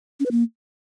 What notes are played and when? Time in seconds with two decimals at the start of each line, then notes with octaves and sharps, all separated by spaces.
0.20 C#4
0.26 B4
0.31 A#3